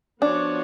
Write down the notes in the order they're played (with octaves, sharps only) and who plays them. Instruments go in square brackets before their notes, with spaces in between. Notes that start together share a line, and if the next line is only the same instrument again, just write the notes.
[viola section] F3 B3 F#4 C#5 [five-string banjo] D4